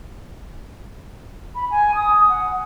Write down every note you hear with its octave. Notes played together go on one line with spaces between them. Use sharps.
B5
G#5
D#6
F#5